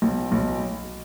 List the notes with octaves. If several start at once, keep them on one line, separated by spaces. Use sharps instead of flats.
B1
B1